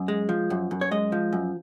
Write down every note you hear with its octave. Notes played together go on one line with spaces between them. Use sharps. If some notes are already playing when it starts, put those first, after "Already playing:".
Already playing: F#2
G#3
F3
F#2
F#2
C#5
G#3 D#5
F3
F#2